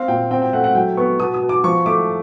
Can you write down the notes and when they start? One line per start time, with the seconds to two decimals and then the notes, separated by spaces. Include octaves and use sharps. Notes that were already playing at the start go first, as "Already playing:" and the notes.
Already playing: C4 F5
0.08 A#2 G5
0.31 C4 G5
0.42 G5
0.53 A3 F#5
0.64 F#5
0.75 F#3 G5
0.97 B3 C#6
1.20 B2 D#6
1.34 D#6
1.42 B2
1.49 D6
1.64 F3 C#6
1.86 A3 D6